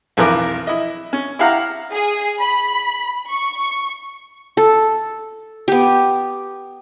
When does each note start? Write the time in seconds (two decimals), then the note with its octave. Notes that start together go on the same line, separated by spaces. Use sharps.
0.17 B1 F2 E3 A#4 D6
0.67 E4 D#5
1.13 C#4
1.39 E4 G4 F5 F#5 A#5
1.91 G#4
2.40 B5
3.30 C#6
4.57 A4
5.68 B3 G4